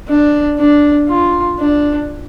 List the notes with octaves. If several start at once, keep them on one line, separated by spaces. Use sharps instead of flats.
D4
D4
F4
D4